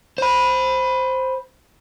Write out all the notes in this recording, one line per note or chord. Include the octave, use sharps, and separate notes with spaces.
C5 B5